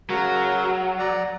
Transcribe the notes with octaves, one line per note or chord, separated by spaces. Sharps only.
C#3 F#3 F#4 A#4
D5 F#5 A#5